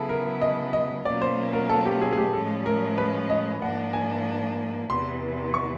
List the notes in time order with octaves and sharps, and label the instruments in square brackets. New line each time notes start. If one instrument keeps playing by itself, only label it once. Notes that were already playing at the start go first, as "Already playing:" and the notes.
Already playing: [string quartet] C#3 F#3 B3 E4 [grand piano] G#4 A4
[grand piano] A#4
D#5
D#5
[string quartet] B2 F#3 A#3 C#4 F4 [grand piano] D5
[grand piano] C5
A#4
A4
G4
G#4
G#4
G4
[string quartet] A2 F3 G#3 C#4 [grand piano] A4
[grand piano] A#4
B4
D#5
[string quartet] G#2 F3 A#3 D4 [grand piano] F#5
[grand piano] G#5
[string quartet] E2 C3 E3 [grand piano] C6
[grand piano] C#6